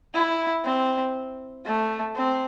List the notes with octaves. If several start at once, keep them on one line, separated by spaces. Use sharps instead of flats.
E4
C4
A3
C4